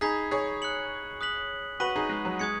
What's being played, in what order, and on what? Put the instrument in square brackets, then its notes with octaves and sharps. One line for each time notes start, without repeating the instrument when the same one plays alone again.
[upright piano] D#4 G#4 [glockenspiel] B5 G#6 B6
[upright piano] G#4 C#5
[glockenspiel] F#6 C#7 F#7
D#6 F#6 B6 F#7
[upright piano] F#4 B4 [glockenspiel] C#6 B6 D#7 F#7
[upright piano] D#4 G#4
G#3
F#3
[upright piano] G#3 [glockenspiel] D#6 G#6 C#7